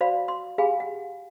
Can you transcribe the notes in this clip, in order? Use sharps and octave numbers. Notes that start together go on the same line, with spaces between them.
F#4 C5 D5 F5 B5
C6
G4 G#4 F5 G#5 B5
F#5